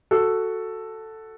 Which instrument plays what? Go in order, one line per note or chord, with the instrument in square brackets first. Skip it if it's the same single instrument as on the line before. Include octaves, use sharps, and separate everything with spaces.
[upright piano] F#4 A4